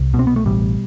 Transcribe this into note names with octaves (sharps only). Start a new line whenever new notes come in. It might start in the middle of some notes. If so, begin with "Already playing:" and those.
Already playing: C2
B2
C4
B3
A3
A1 G3